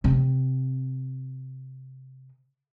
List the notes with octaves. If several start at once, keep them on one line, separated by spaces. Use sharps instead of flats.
C3 C4